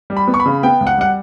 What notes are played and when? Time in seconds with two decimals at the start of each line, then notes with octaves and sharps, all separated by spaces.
0.10 G3
0.17 B5
0.28 B3
0.34 C#6
0.40 B5
0.45 C#3
0.63 B3 G5
0.81 C#2
0.87 F#5
0.98 G3 F#5